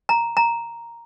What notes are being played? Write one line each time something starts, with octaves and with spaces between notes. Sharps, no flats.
A#5
A#5